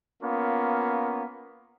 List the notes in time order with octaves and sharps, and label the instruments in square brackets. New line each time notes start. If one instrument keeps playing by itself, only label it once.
[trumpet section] A#3 B3 C#4 F4